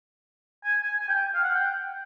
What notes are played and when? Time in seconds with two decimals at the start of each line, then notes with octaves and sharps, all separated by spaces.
0.64 G#5
0.84 G#5
1.02 G#5
1.09 G5
1.35 F5
1.44 F#5
1.54 G5